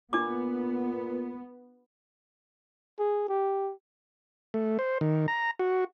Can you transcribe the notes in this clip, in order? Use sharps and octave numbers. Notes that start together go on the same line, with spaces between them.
A#2 B3 D4 F4 D6
G#4
G4
A3
C5
D#3
A#5
F#4